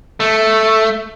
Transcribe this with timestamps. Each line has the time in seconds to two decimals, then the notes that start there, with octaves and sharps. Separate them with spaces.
0.20 A3